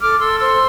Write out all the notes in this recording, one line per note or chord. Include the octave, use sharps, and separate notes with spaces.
A4 D6 F6
A4 C6 E6
C5 C6 E6